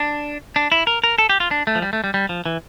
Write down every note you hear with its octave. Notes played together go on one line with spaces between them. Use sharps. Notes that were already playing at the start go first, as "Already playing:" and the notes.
Already playing: D4
D4
E4
A#4
A#4
A4
G4
F4
D4
A3
F3
G3
A3
G3
G3
F3
E3